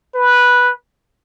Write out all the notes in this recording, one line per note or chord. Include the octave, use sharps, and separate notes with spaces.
B4